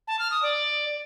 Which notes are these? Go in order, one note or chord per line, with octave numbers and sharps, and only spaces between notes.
A5
F6
D#6
D5